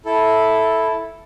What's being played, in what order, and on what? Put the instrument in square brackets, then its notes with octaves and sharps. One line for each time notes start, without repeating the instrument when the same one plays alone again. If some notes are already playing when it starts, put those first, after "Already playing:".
[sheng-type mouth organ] E4 A4